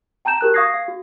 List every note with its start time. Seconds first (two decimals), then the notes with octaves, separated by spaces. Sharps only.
0.25 G5 A5 A#5 G6 E7
0.41 F#4 G4 A#4 F#6
0.54 F5 C#6 D#6 G#6 A#6 C7
0.74 F5
0.88 F#4